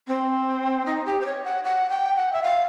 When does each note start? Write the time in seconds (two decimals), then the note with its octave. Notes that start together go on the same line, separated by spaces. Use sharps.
0.08 C4
0.86 D#4
1.06 G4
1.21 C5
1.26 C#5
1.45 F#5
1.64 F#5
1.90 G5
2.16 F#5
2.33 E5
2.43 F5